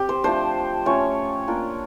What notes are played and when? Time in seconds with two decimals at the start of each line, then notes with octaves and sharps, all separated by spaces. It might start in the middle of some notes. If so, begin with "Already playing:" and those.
Already playing: C4 G4
0.09 C5
0.24 F3 A3 D4 C5
0.86 A3 C#4 F4 C#5
1.48 A#3 D4 F4